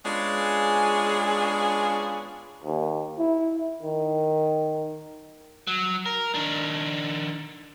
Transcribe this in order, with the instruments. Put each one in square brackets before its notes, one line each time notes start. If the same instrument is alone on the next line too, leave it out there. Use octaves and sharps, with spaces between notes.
[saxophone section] G#3 B3 C#4 D4 F4 G#4
[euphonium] D#2
E4
D#3
[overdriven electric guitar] F#3
A#4
D#3 D4